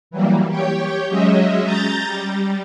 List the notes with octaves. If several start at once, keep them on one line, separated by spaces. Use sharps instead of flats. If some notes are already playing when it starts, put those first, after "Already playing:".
E3 F#3 G3 A#3
G4 C#5 G5
F#3 G#3 C#4 D#5 E5
A#5 G6 A6
G3